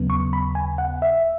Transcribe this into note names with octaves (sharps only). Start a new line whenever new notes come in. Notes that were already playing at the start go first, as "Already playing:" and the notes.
Already playing: D#2 C#3 F#3 B3
C#6
B5
G#5
F#5
E5